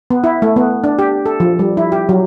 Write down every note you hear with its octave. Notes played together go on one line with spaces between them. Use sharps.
B3
E4
A3
B3
D4
G4
A4
F3
G3
E4
G4
F#3